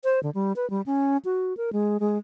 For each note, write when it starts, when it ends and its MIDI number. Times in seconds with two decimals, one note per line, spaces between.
0.04 0.20 72
0.23 0.30 50
0.35 0.53 55
0.56 0.68 71
0.70 0.82 55
0.86 1.17 61
1.25 1.56 66
1.57 1.73 70
1.73 1.98 56
2.00 2.18 56